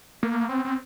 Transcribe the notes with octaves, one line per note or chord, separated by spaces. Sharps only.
A#3
C4
C4